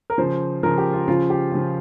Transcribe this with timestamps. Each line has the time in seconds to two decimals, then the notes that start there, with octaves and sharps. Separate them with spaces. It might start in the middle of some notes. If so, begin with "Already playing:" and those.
0.10 A#4
0.18 C#3 F3 C5
0.63 C#3 F3 A#4
0.78 G4
0.93 F4
1.08 C#3 F3 F4
1.30 G4
1.52 C#3 F3